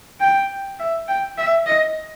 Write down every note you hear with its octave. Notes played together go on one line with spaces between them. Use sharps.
G5
E5
G5
E5
D#5